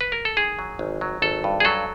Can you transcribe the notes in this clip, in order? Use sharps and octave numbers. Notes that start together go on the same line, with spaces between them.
B4
A#4
A4
D#3 G#4
F#3
G#1
F#3
G#1 A4
G2
G#4
F#3 A4